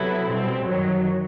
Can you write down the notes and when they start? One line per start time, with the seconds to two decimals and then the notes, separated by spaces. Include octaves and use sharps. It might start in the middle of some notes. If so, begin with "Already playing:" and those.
Already playing: C3 F#3 B3 E4 A4
0.27 B2 G3 C4
0.66 F#2 D#3 F#3